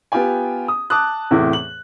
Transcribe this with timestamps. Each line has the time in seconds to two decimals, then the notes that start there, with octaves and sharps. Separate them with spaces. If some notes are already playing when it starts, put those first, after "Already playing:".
0.12 B3 F4 G4 G5 G#5
0.68 D#6
0.90 A5 D6 D#6 F#6
1.31 E2 A2 C3 E3 E4
1.53 F#7